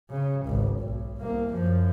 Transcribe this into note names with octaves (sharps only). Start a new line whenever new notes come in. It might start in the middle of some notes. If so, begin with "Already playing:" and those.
C#3
G#1 C#2
B1
C2 A#3
F#2 F3